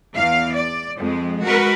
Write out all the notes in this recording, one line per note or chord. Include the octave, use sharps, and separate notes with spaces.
E2 F5
D5
F2 G#3
G#3 F#4 A#4 B4